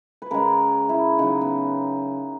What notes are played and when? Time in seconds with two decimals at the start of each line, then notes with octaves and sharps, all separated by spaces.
0.22 B4
0.31 C#3 G#3 A#4
0.89 E4
1.19 C#3 F#3 D#4
1.41 B3